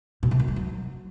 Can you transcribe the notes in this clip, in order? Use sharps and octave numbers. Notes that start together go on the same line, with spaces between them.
B2
C3
F#2
G#3
F#3